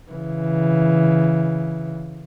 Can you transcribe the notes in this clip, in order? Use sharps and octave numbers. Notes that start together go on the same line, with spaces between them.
C#3 E3